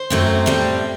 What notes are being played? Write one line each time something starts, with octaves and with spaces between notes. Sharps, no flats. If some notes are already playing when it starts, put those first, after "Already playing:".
Already playing: C5
F#2 F#3 A3 C4
A2 G3 C4